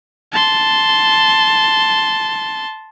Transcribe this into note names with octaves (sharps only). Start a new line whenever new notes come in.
A5 C6